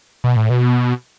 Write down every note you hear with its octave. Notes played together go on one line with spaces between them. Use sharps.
B2
A2
B2